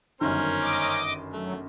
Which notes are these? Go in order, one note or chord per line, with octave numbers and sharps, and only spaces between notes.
G1 F#2 D#3 C#4 A#4 C5
D#5 D6
F#3 A3